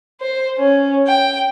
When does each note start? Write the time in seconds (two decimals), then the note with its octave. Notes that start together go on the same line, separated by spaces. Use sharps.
0.21 C5
0.58 C#4
1.07 G5